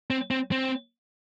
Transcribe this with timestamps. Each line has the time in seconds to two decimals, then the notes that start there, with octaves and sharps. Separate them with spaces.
0.10 C4
0.31 C4
0.52 C4